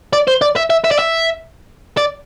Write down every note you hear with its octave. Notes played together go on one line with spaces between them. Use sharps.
D5
C5
D5
E5
E5
E5
D5
E5
D5